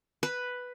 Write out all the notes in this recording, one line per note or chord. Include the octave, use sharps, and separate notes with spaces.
B4